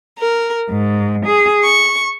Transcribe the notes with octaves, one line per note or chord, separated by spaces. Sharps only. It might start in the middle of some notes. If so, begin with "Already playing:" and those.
A#4
G#2
G#4
C#6